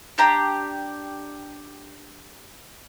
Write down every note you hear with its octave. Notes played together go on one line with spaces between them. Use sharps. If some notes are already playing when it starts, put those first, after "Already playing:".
D4 G4 A#5